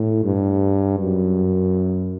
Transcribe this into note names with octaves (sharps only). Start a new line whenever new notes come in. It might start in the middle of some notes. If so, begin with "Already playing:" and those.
Already playing: A2
G2
F#2